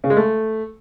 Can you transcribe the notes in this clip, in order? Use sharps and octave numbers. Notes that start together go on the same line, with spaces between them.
C#3
G#3
A3